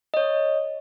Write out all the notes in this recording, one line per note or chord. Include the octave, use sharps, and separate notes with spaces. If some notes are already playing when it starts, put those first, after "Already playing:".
C#5 D#5